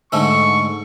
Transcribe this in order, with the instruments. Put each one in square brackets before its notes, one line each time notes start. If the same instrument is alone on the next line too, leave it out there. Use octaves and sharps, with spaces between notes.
[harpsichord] G#2 D3 A3 [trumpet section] C#6